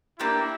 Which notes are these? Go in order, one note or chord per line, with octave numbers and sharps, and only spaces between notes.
A#3 D4 E4 G4